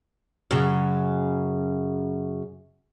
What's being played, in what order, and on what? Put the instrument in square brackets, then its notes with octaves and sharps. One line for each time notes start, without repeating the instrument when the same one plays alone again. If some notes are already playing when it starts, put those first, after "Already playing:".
[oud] F#2 C#3